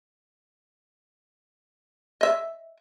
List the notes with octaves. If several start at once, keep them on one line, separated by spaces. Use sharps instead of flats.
D#5 E5